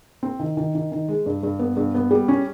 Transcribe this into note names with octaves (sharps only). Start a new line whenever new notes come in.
C4
D#3
D#3
D#3
D#3
G#3
G2
G2
B3
G2
B3
G3
C#4